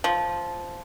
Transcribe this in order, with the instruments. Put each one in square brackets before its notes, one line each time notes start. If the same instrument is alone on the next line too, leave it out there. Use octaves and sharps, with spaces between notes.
[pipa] F3